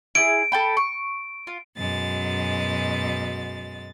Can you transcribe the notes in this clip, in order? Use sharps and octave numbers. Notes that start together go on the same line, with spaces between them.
E4 G4 G#4 D7
A4 G5 B5
C#6
F4
F#2 B2 G#3 A6